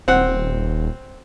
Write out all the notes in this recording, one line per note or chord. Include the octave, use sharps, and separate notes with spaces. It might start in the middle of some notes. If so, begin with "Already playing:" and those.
D#1 C4 F#5